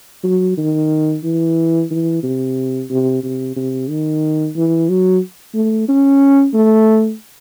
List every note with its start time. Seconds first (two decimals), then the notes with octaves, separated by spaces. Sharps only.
0.24 F#3
0.57 D#3
1.24 E3
1.91 E3
2.23 C3
2.90 C3
3.23 C3
3.56 C3
3.89 D#3
4.56 E3
4.89 F#3
5.54 A3
5.88 C#4
6.54 A3